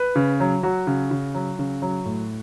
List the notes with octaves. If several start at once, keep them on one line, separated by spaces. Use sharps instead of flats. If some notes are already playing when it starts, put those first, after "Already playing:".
Already playing: B4
C#3
F#3
F#3 F#4
C#3
C#3
F#3
C#3
F#3
A2